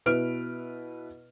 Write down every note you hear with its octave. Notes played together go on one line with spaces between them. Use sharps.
B2 E4 B4 F6 D7